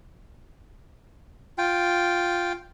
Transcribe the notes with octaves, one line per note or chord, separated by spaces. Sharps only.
F4 G5